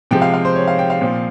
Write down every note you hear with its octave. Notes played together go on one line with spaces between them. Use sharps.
C3 F3 G#3 G5
F5
F5
C5
C#5
F5
G5
F5
A#2 F3 C4